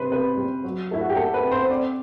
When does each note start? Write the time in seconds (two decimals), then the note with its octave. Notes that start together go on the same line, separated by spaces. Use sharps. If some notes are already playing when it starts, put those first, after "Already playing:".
Already playing: C3 G3 B4 C5
0.11 C3 B4
0.37 G3
0.64 F#3
0.91 A3 E4
1.01 F#4
1.10 G4
1.16 A3 A4
1.34 B4
1.43 C4
1.52 C5
1.69 C4 D5